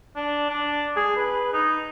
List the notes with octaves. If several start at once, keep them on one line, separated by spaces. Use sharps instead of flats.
D4
D4
G#4
B4
D#4